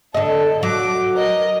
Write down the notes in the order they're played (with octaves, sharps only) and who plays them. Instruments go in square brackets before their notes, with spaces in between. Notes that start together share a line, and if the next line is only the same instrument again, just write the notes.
[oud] D3 D#5 [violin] A4
[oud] F#3 [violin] D6
[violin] A#4 D#5